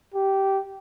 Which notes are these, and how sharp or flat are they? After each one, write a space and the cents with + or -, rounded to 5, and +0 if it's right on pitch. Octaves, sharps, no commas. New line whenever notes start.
G4 -15